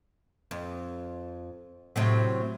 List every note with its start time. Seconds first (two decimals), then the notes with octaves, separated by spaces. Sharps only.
0.51 F2
1.96 A2 C3 F#3